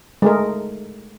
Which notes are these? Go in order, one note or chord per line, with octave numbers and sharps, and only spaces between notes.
G#3 A3 A#4